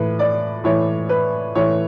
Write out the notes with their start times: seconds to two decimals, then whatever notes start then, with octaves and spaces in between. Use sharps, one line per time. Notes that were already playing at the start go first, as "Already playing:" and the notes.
Already playing: A2 E3 B4
0.19 D5
0.64 A2 E3 C#5
1.09 B4
1.55 A2 E3 C#5